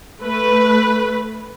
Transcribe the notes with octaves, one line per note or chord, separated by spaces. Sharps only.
A3 B4